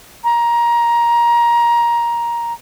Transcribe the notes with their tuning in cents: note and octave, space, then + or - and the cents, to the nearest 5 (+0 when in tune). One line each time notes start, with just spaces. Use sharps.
A#5 +15